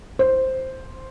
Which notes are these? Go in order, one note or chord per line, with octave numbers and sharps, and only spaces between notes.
C5